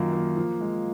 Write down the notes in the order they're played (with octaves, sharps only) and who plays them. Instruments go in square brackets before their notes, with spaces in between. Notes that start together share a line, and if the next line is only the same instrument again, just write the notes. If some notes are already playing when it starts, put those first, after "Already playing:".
Already playing: [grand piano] F#2 D#3 A#3 [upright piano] F4
[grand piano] A#3
F3
G#3